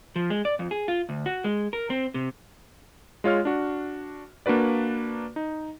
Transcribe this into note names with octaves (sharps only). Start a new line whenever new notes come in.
F3
G#3
D5
F2
G#4
F4
D2
F#4
G#3
A#4
C4
C3
G#3 F4 C#5 F6
D4 F#4
A#3 D4 F#4 B4 D5
D#4